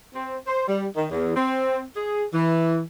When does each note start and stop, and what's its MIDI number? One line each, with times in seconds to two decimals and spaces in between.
0.15 0.37 60
0.47 0.64 72
0.68 0.86 55
0.96 1.05 51
1.10 1.36 40
1.36 1.82 60
1.95 2.25 68
2.33 2.80 52